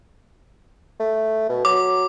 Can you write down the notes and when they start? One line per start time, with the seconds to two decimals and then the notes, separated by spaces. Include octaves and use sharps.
1.00 A3
1.49 B2
1.65 F#3 D6